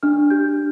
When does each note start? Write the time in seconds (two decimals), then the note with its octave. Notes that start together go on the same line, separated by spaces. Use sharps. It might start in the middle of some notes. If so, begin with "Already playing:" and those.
0.03 D4 F6
0.30 G4 G6